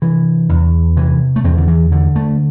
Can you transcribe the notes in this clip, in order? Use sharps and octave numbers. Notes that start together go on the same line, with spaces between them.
C3 E3
E2
C3 E3
A3
E2 C4
D3
E3
D3
A3